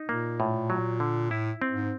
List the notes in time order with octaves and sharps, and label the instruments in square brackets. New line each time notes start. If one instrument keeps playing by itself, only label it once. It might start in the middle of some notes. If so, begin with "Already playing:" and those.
Already playing: [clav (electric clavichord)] D#4
[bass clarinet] A#2 [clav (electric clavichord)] A#3
[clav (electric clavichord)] A2
F#3
D3
[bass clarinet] A2 [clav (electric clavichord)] E4
[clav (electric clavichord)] C4
[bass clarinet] G#2